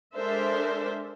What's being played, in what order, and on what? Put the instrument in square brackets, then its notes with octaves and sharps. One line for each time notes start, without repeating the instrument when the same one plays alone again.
[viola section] G#3 D4 A4 A#4 C5 E5